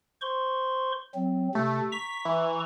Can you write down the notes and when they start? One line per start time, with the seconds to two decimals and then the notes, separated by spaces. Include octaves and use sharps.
0.22 C5 C6 C#6
1.15 F#3 C4
1.55 C3 A3
1.92 A#5 C#6 B6
2.25 E3